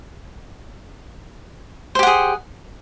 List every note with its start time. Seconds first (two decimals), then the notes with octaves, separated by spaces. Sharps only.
1.95 C5
1.99 G4
2.03 F#5
2.07 G#4